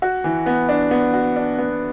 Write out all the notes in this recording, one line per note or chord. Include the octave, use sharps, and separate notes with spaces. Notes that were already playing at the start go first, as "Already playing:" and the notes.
F#4
E3
B3
D4
B3
F#4
D4
B3